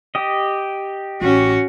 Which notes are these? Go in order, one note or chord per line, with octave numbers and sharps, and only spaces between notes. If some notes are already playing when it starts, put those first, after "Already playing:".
G4 D#5
A1 C#4 F#4